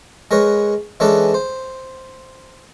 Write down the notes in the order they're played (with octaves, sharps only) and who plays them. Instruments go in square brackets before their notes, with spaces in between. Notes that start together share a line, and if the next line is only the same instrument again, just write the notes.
[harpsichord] G#3 A#4 B4 C#5
E3 G#3 C#4 D4 A4 B4
C5